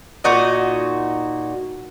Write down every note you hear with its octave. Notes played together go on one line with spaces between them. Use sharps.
A#2 D#4 F#4 D#5